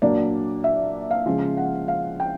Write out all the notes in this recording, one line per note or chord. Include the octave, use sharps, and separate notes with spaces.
A#2 F#3 A#3 D4 D5
E5
F5
C#3 F3 G#3 C#4
F#5
F5
G5